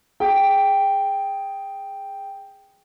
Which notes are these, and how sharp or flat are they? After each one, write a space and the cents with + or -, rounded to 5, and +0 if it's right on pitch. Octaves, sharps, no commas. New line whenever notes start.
G#4 +0 G5 +0